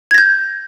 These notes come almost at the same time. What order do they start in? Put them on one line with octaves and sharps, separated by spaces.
G#6 A#6 G6